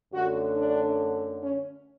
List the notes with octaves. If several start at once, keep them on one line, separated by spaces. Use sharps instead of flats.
F#2 D3 A3 F#4
D4
C#4